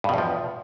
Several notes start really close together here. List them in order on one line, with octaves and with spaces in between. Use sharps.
G2 B2 E2 F3